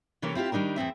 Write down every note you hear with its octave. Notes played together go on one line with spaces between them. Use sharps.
C3 E3 A#3 C#4 A4 A#4
C4 E4 F4 G4
D#3 G3 D4 D#4 A#4
E2 G#2 C4 E5